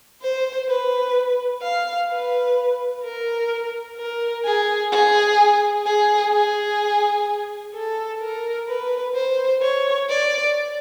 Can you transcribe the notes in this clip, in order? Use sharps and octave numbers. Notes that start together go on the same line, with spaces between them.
C5
B4
F5
B4
A#4
A#4
G#4
G#4
G#4
G#4
A4
A#4
B4
C5
C#5
D5